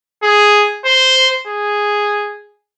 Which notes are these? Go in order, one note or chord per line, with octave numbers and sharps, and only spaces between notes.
G#4
C5
G#4